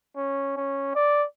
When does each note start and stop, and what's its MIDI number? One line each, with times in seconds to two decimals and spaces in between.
0.16 0.53 61
0.57 0.94 61
0.95 1.25 74